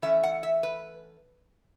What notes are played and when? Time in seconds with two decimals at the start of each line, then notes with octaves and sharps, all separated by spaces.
0.02 E3 A3 C#4 E5
0.23 F#5
0.43 E5
0.63 B4